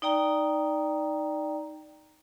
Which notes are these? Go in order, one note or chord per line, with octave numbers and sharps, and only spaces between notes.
D#4 D5 G5 A#5